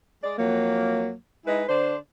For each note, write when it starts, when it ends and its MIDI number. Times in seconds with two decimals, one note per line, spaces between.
0.23 0.36 56
0.23 0.36 74
0.38 1.14 41
0.38 1.14 54
0.38 1.14 58
1.46 1.63 56
1.46 1.63 63
1.46 1.63 64
1.46 1.63 71
1.68 1.96 50
1.68 1.96 62
1.68 1.96 72